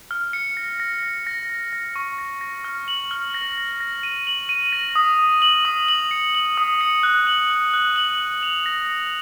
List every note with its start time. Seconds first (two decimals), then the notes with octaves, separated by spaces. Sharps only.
0.11 F6
0.33 C#7
0.57 A#6
0.80 A#6
1.03 A#6
1.27 A#6
1.50 A#6
1.73 A#6
1.96 C#6
2.18 A#6
2.41 A#6
2.64 F6
2.88 F#7
3.11 F6
3.34 A#6
3.58 A#6
3.80 A#6
4.03 D#7
4.27 F#7
4.49 D#7
4.73 A#6
4.95 D#6
5.19 D#6
5.42 F#7
5.65 D#6
5.88 F#7
6.11 C#7
6.35 F#7
6.58 D#6
6.81 C#7
7.03 F#6
7.27 F#7
7.50 F#6
7.74 F#6
7.96 F#7
8.19 F#6
8.43 F7
8.66 A#6
8.89 C#7